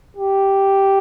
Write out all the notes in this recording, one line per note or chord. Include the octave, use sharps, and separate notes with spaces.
G4